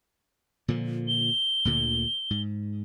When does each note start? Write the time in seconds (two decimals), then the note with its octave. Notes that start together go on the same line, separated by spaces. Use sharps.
0.68 A#2 D3 F3
1.08 G7
1.65 D2 A#2 D3
2.30 G#2